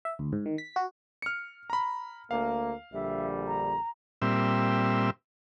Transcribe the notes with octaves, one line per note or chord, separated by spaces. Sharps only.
E5
D2
G#2
D#3
B6
F#4
F6 C#7
A#5 B5
D2 A#3 F5
A#1 D3 G3 E5
A#5
A#2 G3 C4 E5